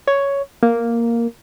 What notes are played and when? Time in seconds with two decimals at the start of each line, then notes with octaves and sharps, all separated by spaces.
0.07 C#5
0.63 A#3